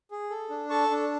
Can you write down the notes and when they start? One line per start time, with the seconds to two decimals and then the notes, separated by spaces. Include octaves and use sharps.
0.11 G#4
0.30 A4
0.50 D4
0.70 A4 A5 C#6
0.91 D4